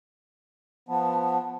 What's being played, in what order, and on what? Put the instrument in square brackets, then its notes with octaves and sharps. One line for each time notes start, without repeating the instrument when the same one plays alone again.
[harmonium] F3 B3 [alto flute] A5